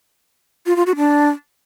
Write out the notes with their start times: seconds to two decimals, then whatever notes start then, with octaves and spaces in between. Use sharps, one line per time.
0.66 F4
0.76 F4
0.86 F#4
0.96 D4